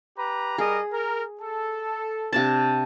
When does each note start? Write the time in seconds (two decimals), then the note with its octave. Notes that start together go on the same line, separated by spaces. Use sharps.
0.17 G4 B4 A#5
0.58 G3 G#4 A#4 D#5
0.92 A#4
1.42 A4
2.33 C3 D4 A5